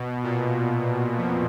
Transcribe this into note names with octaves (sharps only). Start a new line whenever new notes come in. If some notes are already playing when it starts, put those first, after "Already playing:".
Already playing: B2
A#2
F2